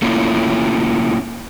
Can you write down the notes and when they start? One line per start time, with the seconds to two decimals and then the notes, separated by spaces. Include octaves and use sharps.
0.02 A3 A#3 C#4 E4 F4